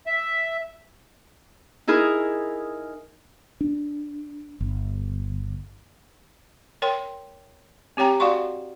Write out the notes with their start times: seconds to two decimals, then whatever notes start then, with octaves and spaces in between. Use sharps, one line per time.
0.07 E5
1.87 D#4 E4 G#4 A#4
3.61 D4
4.61 G1
6.82 A#4 C#5 G5 C6
7.97 C4 G4 C#5 G5 A#5
8.20 F#4 D5 F5 F#5 C6 C#6